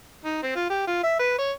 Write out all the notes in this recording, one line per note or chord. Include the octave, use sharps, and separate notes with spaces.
D#4
C4
F4
G4
F4
E5
B4
C#5